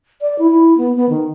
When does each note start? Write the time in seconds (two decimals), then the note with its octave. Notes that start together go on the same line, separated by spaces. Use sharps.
0.21 D5
0.39 E4
0.50 E4
0.78 B3
0.96 B3
1.09 D#3